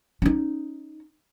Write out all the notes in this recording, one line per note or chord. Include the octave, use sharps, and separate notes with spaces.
C#4 D#4